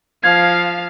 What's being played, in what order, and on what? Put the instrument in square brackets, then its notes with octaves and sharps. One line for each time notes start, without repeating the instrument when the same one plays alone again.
[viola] F3 [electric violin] F5 [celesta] G#6